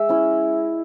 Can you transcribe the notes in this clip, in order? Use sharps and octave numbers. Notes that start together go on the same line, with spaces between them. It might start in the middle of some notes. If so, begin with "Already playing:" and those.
Already playing: G#3 E5
C#4 E4